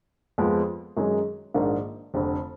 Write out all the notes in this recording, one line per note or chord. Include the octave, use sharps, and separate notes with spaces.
F2 F3 G#3 B3
F#2 D#3 G#3 D#4 G#4
A#1 G#2 D#3 A#3 D4
F1 F2 D3